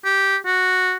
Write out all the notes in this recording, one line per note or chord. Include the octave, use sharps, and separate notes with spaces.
G4
F#4